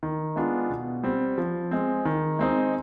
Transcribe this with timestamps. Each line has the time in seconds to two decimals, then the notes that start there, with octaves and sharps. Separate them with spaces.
0.03 D#3
0.36 G#3 B3 D4 F4
0.70 B2
1.03 G3 C4
1.38 F3
1.71 G#3 C4
2.05 D#3
2.39 G#3 C4 D#4